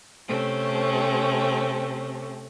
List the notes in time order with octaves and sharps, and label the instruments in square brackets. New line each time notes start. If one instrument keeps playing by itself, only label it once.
[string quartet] C3 A3 C4 C#4